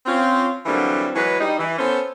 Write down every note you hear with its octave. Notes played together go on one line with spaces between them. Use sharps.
C4 C#4 F4
D3 E3 F#3 G3 A#3 C4
E3 F#3 G#3 B4
G3 D#4
E3
B3 C#4 A4 C5